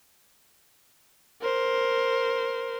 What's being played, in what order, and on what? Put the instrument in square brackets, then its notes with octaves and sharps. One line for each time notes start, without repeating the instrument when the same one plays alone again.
[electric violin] A#4 C5